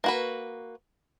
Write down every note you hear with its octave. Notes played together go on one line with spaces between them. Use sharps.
A#3 F#4 B4